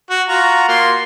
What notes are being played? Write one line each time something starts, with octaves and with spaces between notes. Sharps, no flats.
F#4
F4 F#4 A#5
A#3 F4 C6